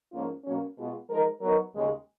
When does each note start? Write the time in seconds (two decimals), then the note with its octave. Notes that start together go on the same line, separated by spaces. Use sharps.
0.11 G#2 F3 A#3 C#4 F4
0.44 B2 F#3 A#3 C#4
0.76 B2 G#3 B3 F4 G#4
1.09 F3 G#3 D#4 A#4
1.41 F#3 B3 D#4 A#4
1.73 D#2 C#3 G#3